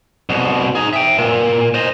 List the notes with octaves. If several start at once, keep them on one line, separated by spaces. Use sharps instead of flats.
C2 B2
D#4 G#4
E5 G5
A#2
C5 D#5